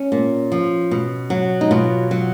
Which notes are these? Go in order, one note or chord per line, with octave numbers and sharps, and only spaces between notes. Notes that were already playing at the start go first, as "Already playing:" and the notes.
Already playing: C#4
A#2
F3
B2
F#3
D#4
B2 F4
F#3